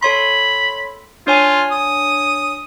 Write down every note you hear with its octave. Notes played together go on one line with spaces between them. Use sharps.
A4 C#5 B5 C6
D4 F4 C#5 G#5
D#6